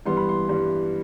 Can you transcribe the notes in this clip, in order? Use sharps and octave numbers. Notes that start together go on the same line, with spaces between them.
G2 E3 G3 B3 C6
B5
C6
G2 E3 G3 B3